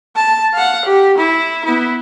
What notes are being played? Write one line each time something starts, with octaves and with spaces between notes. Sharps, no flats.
A5
F5 F#5
G4
E4
B3 E4